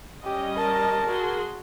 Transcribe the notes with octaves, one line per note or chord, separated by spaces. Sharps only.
G3 C#4 G4 D#5
A#4 A5
F#4 G#4 C6